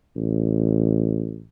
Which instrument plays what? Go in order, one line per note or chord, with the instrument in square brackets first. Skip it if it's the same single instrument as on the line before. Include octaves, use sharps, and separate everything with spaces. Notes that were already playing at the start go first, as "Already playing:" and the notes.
[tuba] A1